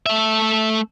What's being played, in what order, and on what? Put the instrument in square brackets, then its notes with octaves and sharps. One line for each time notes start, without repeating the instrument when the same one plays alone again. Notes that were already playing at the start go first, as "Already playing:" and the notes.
[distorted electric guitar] A3 E5